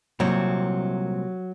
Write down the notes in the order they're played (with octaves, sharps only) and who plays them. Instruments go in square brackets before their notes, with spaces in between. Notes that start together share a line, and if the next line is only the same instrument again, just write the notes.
[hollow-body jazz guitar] C2 A#2 C4 [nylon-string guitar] F#3